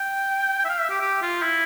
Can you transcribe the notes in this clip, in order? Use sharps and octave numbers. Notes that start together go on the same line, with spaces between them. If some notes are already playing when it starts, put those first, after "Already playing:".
Already playing: G5
G5
E5
F5
E5
G4
G4
F4
E4